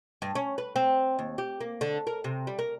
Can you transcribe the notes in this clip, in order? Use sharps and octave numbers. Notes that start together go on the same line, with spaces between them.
G2
C#4
B4
C4
D#2
G4
A#3
D3
A#4
C3
G3
A#4